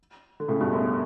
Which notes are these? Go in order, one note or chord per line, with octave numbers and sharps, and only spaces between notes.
D3
A2 C#3
G2 B2
F#2